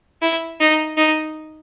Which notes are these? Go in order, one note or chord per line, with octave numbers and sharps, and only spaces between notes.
E4
D#4
D#4